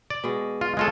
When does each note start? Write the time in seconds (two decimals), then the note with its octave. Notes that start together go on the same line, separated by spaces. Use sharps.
0.10 D5
0.24 B2 G#3
0.61 F4
0.77 G#3 C#4 F4 A4 D#5